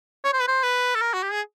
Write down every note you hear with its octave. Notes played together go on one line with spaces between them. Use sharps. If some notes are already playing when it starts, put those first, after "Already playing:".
C#5
C5
B4
C5
B4
A4
A#4
F#4
G4
G#4